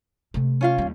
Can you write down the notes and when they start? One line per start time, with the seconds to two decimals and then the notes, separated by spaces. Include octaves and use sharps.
0.34 C3 A3
0.61 C#4 F4 F5
0.78 D#2 G3